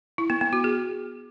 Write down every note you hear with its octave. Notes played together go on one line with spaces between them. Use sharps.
E4
B3
B3
F#4
G#4